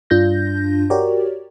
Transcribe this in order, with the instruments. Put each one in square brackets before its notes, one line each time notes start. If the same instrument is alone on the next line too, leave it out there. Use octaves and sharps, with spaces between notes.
[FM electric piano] G2 D4 F4 G6 A#6
F#4 G4 A#4 C#5 D5